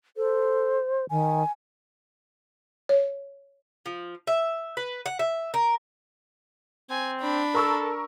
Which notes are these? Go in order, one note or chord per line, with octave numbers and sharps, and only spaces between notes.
A4 C5
D#3 G#5
C#5
F3
E5
B4
F#5
E5
A#4
C4 G#5
D4 B5
A4 A#4 C#6 E6